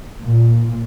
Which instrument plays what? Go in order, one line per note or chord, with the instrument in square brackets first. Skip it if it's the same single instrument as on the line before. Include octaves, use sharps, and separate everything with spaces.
[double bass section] A#2